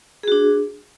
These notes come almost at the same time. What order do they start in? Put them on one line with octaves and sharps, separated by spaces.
G#4 F#4 D4